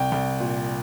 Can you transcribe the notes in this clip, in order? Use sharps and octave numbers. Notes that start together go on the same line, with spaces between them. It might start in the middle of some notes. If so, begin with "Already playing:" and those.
Already playing: C2 G5
C2
A#2